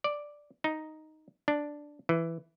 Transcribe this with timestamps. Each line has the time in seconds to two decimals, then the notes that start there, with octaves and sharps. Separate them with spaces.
0.04 D5
0.64 D#4
1.48 D4
2.09 E3